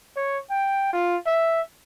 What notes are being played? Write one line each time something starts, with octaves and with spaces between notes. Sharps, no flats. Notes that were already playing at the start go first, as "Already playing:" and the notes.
C#5
G5
F4
E5